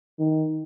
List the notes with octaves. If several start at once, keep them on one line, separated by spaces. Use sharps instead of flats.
D#3